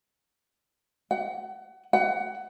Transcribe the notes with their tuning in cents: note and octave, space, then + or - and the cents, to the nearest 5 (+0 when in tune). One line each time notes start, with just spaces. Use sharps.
F#5 +30
F#5 +25